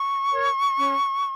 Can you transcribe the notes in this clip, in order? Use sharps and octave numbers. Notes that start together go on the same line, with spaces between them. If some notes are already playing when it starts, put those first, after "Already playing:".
Already playing: C#6
A#4 C#5
C#4